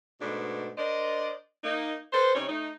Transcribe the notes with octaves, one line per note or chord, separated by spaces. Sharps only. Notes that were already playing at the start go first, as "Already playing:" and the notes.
G#2 B2 A3 B3 D4
D4 A#4 C5 D5 D#5
A#3 D#4
A4 B4 C5
C3 G3 C#4 D#4 C#5
A3 D#4